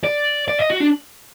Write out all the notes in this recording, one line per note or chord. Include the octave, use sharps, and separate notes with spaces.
D5
D5
D#5
F#4
D4